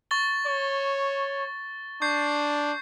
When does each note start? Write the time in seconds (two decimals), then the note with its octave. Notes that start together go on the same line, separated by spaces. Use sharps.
0.11 C#6 A6 G7
0.46 C#5
2.02 D4 C#6 G6 C7